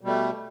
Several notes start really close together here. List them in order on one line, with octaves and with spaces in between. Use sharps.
B2 G3 A3